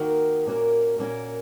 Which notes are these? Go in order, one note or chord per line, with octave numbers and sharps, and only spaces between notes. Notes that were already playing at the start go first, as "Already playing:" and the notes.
Already playing: D#3 A#3 F#4 A#4
A#2 A#3 C#4 F#4 A#4
A#2 A#3 C#4 F#4 A#4